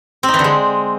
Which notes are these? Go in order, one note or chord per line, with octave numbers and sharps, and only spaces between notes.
C4
D#4
E3
D3
G#3